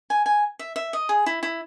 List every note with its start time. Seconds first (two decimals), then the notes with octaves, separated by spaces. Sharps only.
0.10 G#5
0.26 G#5
0.59 E5
0.76 E5
0.93 D#5
1.09 G#4
1.26 E4
1.43 E4